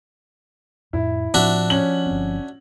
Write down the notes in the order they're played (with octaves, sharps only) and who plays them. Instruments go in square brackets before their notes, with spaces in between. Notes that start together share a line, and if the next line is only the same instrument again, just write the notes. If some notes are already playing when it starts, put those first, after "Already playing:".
[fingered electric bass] F2 A2 [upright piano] E4
[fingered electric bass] A2 C4 [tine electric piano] F3 [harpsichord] D4 F#4 E5
[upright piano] C#4 F#7
[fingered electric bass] G1 C4